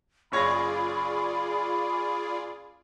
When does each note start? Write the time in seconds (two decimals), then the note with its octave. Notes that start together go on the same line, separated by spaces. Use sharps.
0.32 F#1 F4 G#4 C#5 D5 B5 A#6